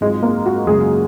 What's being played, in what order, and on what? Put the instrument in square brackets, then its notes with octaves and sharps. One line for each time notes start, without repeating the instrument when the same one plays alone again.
[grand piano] G#2 F#3 C4 F4 [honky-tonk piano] G#3
[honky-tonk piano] A#3
F#4
[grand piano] F#2 C#3 G#3 [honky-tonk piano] G#4